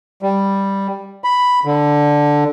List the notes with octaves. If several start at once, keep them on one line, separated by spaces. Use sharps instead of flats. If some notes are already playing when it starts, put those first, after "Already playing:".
G3
B5
D3